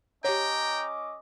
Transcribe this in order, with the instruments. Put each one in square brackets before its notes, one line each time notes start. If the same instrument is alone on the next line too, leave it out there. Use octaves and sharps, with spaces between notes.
[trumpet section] C#4 D#5 D6 [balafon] G4 C#5 [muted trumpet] G5 [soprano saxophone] A#5